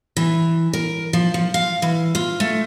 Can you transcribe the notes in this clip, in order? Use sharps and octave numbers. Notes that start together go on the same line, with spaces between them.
E3
A#4
F3
F3
F5
E3
F4
A3